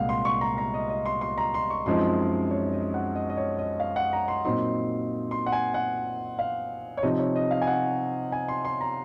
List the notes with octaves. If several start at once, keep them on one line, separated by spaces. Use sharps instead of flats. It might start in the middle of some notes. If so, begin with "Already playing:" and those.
Already playing: C2 A#2 G#3 F5 F#5
C6
C#6
A#5
A#5
D#5
D#5
C6
C6
A#5
C6
C#6
F#2 F3 G#3 C4 D#4 C6
C#5
D#5
F#5
D#5
D#5
C#5
D#5
F5
F#5
A#5
C6
A#2 F#3 C4 D#4 C6
C6
F#5
G#5
F#5
F5
C#5
C3 F3 C4 D#4 D#5
C#5
D#5
F5
G#5
F#5
G#5
C6
C6
A#5